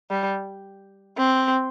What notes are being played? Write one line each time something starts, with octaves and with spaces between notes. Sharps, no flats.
G3
C4